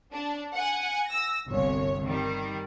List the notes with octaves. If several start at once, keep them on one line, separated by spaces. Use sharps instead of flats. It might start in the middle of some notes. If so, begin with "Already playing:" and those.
D4
F#5 G#5
E6 A#6
G1 C2 C#5
D#3 G3